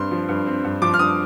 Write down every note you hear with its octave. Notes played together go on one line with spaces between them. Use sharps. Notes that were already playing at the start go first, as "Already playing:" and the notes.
Already playing: G2 C4 C6
F3
G2
C4
G2
F3 D6
F6
G2 D#6